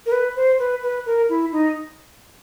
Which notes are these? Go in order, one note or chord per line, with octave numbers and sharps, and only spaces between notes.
A#4
B4
C5
B4
B4
A#4
E4
D#4